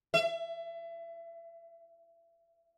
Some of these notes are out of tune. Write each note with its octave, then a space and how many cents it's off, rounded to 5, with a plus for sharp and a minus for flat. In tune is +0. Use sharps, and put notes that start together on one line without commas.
E5 +30